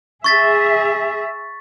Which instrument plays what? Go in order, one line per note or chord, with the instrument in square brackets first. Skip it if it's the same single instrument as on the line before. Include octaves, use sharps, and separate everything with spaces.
[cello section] G#4 E5 [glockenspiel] C#6 A6 B6